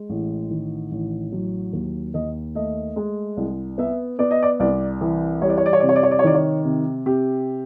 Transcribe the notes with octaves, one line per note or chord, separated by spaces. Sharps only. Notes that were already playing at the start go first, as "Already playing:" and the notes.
Already playing: G#3
A1
D#3
A1
F#3
D#2
D#2 D#5
A3 D#5
G#3
C2
B3 E5
B3 D5
D#5
D5
C2 D5
E3
G3 C#5
D5
C#5
D5
C#5
C3 D5
C#5
D5
C#5
D5
C#5
D#3 D5
C#5
C3
C3 G4